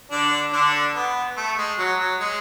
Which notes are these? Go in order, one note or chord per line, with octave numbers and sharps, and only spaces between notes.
D3 D4
D3 D4
B3
A3
G#3
F#3
F#3
G#3